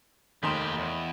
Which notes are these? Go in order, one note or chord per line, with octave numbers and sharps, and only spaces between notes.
F1 D#2 D#3 G4 D#5 G5 B5 C6
E2